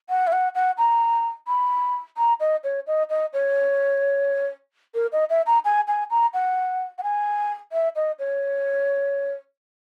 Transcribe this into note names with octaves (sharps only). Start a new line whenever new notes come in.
F#5
E5
F#5
F#5
A#5
B5
A#5
D#5
C#5
D#5
D#5
C#5
A#4
D#5
E5
A#5
G#5
G#5
A#5
F#5
F#5
G#5
E5
D#5
C#5